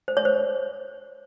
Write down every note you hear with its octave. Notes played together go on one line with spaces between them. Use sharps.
C5
C#5
C5